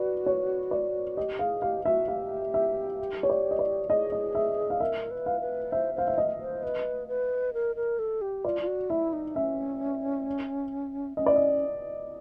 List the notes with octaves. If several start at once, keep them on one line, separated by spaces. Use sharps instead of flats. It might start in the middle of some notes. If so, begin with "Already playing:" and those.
Already playing: F#4 B4 D5
C#5
D5
G4 D#5
G#4 F5
G4 F5
F#4 E5
G4 F5
E5
C#5
D5
D#5
D5
G#4 D#5
D#5
E5
F5
A#4 E5
B4
F5
B4
C5 E5
C5 F5
E5
D#5
C5
B4
B4
A#4
A#4
A4
G4
F4 D5
F4
F#4
E4 E5
D#4
C#4 E5
C#4 D#5
D5
D#5